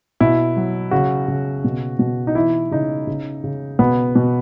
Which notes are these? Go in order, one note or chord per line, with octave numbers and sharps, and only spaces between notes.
B2 E4
F#3
C#3 F#4
C#3
B2
B2
D#4
E3 E4
C#3 D#4
C#3
C#3
B2 B3
B2